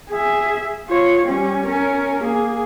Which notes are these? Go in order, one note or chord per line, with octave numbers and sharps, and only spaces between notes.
G#4 E5
F4 C#5
G3 C#4
C#4 A#4
A#3 G#4